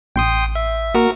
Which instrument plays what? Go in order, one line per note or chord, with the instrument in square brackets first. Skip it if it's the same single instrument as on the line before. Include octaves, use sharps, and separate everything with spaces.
[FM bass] A1 [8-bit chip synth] G5 C6 D#6
[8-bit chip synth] E5
[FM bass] A#3 [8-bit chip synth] F#4 A#4